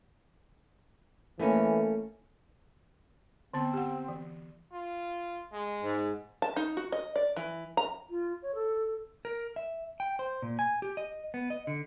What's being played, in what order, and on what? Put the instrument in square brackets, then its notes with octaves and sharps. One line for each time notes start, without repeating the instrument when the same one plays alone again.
[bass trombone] E3 [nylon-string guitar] A3 A#3 C#4
[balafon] D3 B3 A5 [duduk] C4
[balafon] G4 F#5
E3
[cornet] F4
G#3
[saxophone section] G#2
[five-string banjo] A5
D#4
F#4
D#5
D5
E3
A#5
[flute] F4
C#5
A4
[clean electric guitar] A#4
E5
G5
C5
A#2
G#5
G4
D#5
B3
D#5
D3